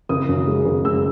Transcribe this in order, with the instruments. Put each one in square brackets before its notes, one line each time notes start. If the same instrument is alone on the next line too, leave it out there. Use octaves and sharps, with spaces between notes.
[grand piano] F#1 D#6
F#2
G#3
F#1
G#3 E6